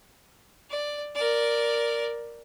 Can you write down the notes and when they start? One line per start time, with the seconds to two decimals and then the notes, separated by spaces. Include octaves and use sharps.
0.70 D5
1.15 A#4 D5